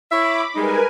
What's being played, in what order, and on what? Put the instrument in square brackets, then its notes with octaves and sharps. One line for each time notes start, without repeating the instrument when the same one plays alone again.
[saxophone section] E4 C#5 E5 [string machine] B5 D6
[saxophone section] G3 G#3 D#4 [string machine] A#4 B4 G#5